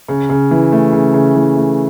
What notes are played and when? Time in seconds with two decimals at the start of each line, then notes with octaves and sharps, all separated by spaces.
0.09 C#3
0.30 C#3
0.51 E3
0.72 A3
0.93 C#3
1.14 C#3
1.35 E3
1.56 A3